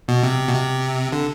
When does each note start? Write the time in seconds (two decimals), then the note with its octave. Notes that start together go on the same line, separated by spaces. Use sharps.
0.08 B2
0.23 C3
0.47 B2
0.54 C3
1.12 D3